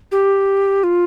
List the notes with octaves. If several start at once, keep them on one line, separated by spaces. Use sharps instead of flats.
G4
F4